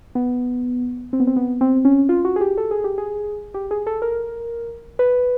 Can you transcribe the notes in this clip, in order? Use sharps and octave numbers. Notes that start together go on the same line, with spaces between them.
B3
C4
B3
C4
B3
C4
C#4
F4
F#4
G#4
G4
A4
G#4
G4
G#4
G4
G#4
A4
A#4
B4